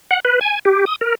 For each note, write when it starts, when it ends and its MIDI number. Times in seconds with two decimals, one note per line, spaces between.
0.11 0.20 78
0.25 0.39 71
0.41 0.59 80
0.65 0.85 67
0.86 0.96 87
1.01 1.15 70